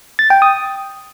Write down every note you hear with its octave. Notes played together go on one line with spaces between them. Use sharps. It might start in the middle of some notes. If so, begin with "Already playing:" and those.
A6
G5
D#6